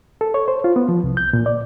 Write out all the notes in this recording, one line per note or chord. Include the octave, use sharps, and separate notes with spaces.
A4
C#5
C5
F4
B3
F3
C2
G6
A#2
D5